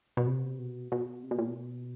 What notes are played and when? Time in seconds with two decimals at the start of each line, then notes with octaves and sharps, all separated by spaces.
0.17 B2
0.27 C3
0.59 B2
0.92 B2
1.23 C3
1.31 B2
1.39 A#2
1.47 B2